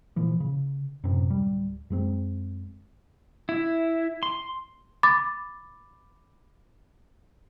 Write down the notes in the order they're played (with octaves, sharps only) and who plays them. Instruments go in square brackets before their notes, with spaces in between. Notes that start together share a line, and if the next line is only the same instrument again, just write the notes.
[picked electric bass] A#2 E3 F3
C#3
F#2 A2 C3
D1 G3
F#2 G#3 C4
[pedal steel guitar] E4
C6
[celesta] B5 D6 A6